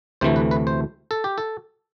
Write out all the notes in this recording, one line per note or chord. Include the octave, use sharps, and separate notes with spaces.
D2 C3 E3 A3 C5
B4
B4
C5
A4
G4
A4